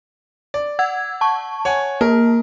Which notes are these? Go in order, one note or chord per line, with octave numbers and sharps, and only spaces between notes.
D5
F#5 E6 G#6
A5 C#6
C#5 F#5 G#5
A#3 A#4